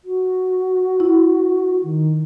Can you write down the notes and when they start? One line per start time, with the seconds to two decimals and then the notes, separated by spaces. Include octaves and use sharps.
0.04 F#4
1.00 E4
1.83 D#3